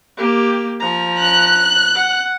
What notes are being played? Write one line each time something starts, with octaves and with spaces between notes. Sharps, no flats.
A#3 G4
F3 A#5
F#6
F#5